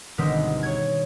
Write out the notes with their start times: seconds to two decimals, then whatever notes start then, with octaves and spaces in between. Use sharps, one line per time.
0.18 G1 B2 D#3 G#3 C4 B6
0.63 C#5 G#6